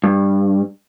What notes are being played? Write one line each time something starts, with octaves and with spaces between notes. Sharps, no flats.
G2